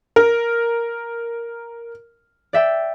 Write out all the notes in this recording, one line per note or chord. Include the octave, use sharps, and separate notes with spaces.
A#4
D5 E5 G5